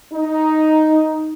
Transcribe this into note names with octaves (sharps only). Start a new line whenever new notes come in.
D#4